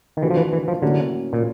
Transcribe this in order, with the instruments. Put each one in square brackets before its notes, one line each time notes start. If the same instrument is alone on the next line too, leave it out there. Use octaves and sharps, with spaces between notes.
[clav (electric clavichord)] D#3
[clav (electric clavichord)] E3 [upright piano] A3 D4 F#4
[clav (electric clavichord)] F3
E3
E3
F3
[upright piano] A2 F#3 A#3 C#4 [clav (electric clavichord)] D3
[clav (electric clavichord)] A#2